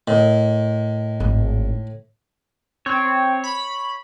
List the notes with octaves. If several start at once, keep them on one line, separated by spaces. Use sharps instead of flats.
A2 A#4 D#5
G#1 G#3
C4 C#5
B5